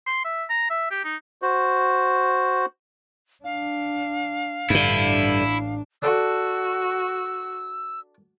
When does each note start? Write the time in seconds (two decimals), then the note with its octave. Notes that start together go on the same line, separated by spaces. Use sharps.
0.07 C6
0.25 E5
0.50 A#5
0.70 E5
0.91 G4
1.04 D#4
1.42 F#4 C5
3.44 D4 F5
4.70 A1 G2 D3 D4 E4
6.02 D4 F#4 A4 E6